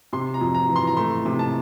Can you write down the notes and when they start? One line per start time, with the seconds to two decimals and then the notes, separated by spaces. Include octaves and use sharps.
0.13 C3 C6
0.34 A#5
0.41 F2
0.55 A#5
0.69 E3
0.76 C6
0.87 A#5
0.97 A3 C6
1.26 C3
1.39 A5